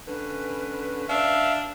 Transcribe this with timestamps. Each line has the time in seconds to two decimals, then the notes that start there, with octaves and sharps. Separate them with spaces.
0.07 D3 C#4 B4
1.09 D4 E5 F5